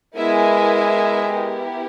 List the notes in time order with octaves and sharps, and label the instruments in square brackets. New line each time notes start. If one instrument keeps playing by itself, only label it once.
[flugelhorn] G#3 [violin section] B3 E4 A#4 E5 G#5
[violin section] B3 E4 G4 A#4